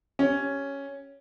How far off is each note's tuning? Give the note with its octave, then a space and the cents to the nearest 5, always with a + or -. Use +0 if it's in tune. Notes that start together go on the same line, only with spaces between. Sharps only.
C#4 +0 G4 +0